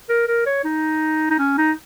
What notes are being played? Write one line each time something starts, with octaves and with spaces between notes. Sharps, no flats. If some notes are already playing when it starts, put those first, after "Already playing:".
A#4
A#4
C#5
D#4
D#4
C#4
D#4